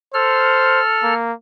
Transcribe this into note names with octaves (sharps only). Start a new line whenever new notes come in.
A4 C5 F6
A#3